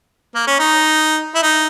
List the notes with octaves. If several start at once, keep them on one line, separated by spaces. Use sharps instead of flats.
A#3
C#4
D#4
E4
D#4